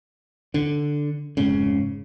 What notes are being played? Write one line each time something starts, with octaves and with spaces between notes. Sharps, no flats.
D3
F1 G#2 C#3